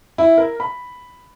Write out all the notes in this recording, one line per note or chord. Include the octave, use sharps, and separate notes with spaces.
E4
A#4
B5